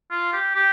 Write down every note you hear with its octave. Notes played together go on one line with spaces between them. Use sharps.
F4
G4
G4